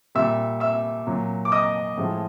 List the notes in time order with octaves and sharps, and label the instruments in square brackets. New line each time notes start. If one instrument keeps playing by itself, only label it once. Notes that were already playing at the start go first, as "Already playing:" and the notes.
[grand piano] A#2 G3 E5 E6
E5 E6
A#2 F#3
D6
D#5 D#6
A2 F3 G#3